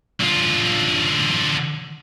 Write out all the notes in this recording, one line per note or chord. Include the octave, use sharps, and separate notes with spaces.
D3 F4